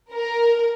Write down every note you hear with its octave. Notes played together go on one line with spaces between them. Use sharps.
A#4